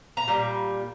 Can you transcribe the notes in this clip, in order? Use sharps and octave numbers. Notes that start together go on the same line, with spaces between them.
A#5
A#2 G3